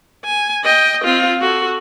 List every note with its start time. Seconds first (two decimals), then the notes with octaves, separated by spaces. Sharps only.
0.25 G#5
0.64 D#5 G5
1.04 C4 F4
1.41 F#4 A4